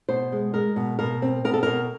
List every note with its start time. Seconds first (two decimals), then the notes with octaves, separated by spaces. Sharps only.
0.09 B2 C5
0.32 G#3
0.54 G#3 A#4
0.76 B2
0.99 B2 A#4
1.22 C4
1.44 B2 A#4
1.54 A4
1.63 B2 A#4